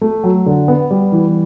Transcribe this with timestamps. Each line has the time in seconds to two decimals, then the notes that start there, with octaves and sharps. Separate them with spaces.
0.01 A3
0.24 F#3
0.46 D3
0.68 B3
0.91 G3
1.12 E3